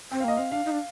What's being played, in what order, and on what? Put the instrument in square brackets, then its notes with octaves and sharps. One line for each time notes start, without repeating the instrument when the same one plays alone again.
[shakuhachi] C4 [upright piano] G5
[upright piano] F5
[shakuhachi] A#3 [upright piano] D#5
[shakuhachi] C4 [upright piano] F5
[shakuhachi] D4 [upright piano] F5
[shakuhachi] D#4
D4